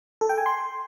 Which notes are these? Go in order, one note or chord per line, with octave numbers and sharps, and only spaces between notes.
A4
G5
G#5
C6